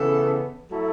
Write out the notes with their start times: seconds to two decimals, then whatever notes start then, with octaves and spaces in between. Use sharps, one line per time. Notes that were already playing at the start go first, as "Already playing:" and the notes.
Already playing: C#3 E3 B3 A4
0.71 F#3 A3 E4 A4